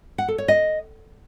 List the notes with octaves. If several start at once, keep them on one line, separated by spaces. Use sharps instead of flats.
F#5
A4
C#5
D#5